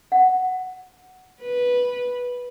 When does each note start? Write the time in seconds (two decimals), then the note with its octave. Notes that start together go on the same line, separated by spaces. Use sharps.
0.12 F#5
1.41 B4